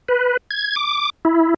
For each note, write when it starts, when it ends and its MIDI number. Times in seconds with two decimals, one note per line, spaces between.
0.09 0.37 71
0.51 0.75 92
0.76 1.10 86
1.25 1.54 64